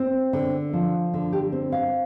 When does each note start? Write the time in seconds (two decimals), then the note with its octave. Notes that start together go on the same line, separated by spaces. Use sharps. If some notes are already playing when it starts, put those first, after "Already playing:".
Already playing: C4
0.33 D3
0.73 F3
1.14 D3
1.33 G4
1.52 C4
1.72 F5